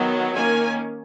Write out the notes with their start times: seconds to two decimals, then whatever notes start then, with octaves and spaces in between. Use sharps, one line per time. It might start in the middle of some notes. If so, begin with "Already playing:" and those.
Already playing: D#3 F#3 B3
0.34 D#3 A#3 C#4 G#5